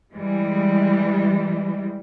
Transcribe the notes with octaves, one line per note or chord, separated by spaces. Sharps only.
E3 G3 G#3